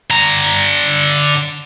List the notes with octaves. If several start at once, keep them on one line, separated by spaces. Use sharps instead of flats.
D3 A#5